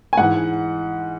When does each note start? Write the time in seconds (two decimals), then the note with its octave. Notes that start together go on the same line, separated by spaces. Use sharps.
0.13 G#5
0.18 G#2 E3 F#5